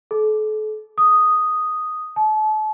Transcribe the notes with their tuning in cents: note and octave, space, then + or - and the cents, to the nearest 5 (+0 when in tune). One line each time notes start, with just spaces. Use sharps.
A4 -40
D#6 +0
A5 -35